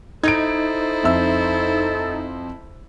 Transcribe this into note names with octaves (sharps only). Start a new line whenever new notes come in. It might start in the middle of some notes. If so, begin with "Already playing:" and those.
D#4 E4 A4 C5 G#6 D7
F2 E5 E6